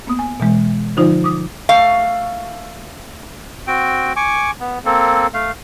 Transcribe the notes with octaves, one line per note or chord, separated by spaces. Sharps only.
A#3 B3 D#6
G#5
B2 E3 G#3
D3 F3 D#4 F4 C5
D6 D#6
A3 F5
C4 F#4 G5
G#5 C#6 D6
B3
A#3 C4 A4
A3 F5